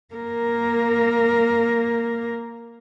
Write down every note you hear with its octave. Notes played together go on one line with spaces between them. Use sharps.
A#3 A#4